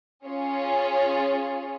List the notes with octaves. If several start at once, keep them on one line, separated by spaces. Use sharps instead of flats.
C#4 F4 G#4 C#5